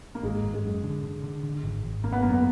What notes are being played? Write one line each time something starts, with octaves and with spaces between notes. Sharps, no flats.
A#3
G#1 G#3
G#1
G#3
F#2
D3
D3
D3
D3
G#1
G#1
G#1 A#3
B3
F#2 A#3
B3